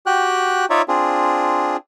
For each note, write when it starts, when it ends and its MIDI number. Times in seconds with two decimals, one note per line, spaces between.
0.06 0.65 66
0.06 0.65 67
0.06 0.65 79
0.06 0.65 90
0.70 0.82 63
0.70 0.82 65
0.70 0.82 73
0.70 0.82 74
0.70 0.82 76
0.88 1.77 60
0.88 1.77 62
0.88 1.77 65
0.88 1.77 68